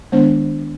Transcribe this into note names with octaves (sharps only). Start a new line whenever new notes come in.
D#3 G#3 B3 D4 C5